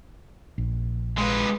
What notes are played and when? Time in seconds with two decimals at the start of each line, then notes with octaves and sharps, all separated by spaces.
0.58 A#1
1.18 G#3 B4